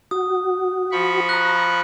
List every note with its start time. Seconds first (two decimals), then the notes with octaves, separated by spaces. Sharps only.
0.11 F#4 D#6
0.92 F3 B5 C#6
1.29 A#5 F#6